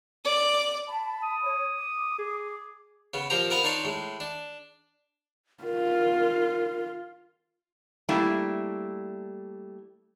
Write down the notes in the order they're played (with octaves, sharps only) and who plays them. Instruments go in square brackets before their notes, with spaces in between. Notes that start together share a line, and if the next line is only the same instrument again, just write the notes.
[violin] D5
[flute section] A5 B5
[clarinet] D#6
[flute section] C#5
D6
[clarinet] G#4
[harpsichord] C#3 B3
A#2 F3 C4 G4 A#5
B3 C4 A#4 B4 D#5 F5
D4 D#4 C#5 D5 C6
A2 G#3
D4
[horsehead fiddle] F4 [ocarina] A#4
[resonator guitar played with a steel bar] G3 A3 A#3 D4 E4